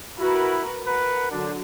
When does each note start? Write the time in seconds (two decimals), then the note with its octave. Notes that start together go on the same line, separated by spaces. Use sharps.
0.19 E4 F#4 A#4 B4
0.87 A#4 B4 F#5
1.31 D3 F#3 D4